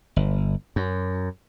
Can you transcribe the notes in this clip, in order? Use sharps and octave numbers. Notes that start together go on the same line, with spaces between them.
G1
F#2